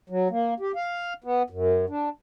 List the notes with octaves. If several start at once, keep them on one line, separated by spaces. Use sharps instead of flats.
F#3
A#3
G4
F5
B3
F#2
D4